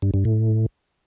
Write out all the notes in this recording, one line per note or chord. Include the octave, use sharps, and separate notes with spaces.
G2
G2
A2